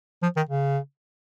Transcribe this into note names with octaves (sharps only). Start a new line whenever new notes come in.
F3
D#3
C#3